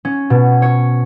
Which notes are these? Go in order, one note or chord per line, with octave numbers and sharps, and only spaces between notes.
C#4
B2
C#5